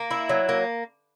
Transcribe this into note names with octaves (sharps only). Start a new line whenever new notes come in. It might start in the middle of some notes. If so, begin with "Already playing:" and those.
Already playing: A#3
E4
F#3
A#3